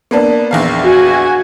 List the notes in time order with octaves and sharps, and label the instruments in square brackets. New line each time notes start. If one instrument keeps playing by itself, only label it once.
[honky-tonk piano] A#3 B3 D4
A#1 E2 F5
[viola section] F#4 G#5